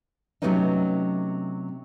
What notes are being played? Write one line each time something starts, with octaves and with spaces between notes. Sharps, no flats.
C3 F#3 A3 B3 C#4 D#4